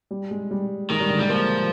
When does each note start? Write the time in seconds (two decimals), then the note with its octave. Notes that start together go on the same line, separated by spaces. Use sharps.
0.11 G3
0.31 G#3
0.51 G3
0.90 D#3 G#3
1.00 G3
1.10 D3
1.19 G3 G#3
1.30 F3 A#3